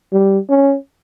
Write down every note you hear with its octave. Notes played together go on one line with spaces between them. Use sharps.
G3
C#4